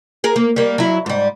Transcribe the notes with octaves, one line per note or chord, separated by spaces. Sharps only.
G#4 A#4
A#3
G3 A#3
F#3 E4
G#2 G3